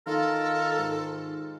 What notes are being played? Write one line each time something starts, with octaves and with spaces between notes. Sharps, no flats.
D#3 F4 A4 A#4
G#2